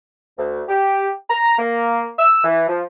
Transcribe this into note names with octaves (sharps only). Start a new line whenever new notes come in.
D2
G4
A#5
A#3
E6
E3
F3